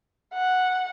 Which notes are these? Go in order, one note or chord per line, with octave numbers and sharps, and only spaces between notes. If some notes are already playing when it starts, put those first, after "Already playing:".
F#5